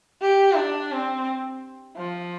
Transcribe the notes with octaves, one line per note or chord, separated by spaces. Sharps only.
G4
D4
C4
F3